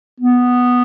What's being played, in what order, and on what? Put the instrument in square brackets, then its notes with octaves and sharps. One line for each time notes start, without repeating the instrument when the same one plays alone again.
[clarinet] B3